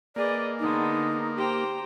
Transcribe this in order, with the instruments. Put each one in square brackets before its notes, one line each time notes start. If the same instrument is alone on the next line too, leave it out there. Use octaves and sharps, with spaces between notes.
[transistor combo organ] A#3 [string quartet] G#4 B4 D#5 [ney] D5
[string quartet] D3 G#3 B3 [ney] D#4
[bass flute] G4 [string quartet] C5 G5 A#5